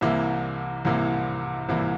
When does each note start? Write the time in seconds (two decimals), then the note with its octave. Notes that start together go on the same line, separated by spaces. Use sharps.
0.01 C2 C3 E3 A#3 E4
0.85 C2 C3 E3 A#3 E4
1.68 C2 C3 E3 A#3 E4